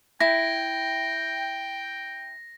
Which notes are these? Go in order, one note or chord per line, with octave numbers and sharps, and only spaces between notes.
E4 G5 A#6